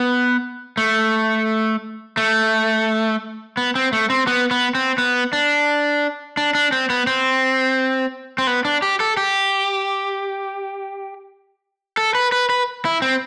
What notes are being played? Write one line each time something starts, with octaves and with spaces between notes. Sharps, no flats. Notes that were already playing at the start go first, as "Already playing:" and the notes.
Already playing: B3
A3
A3
B3
C4
A3
C4
B3
B3
C4
B3
D4
D4
D4
C4
B3
C4
C4
B3
D4
G4
A4
G4
A4
B4
B4
B4
E4
C4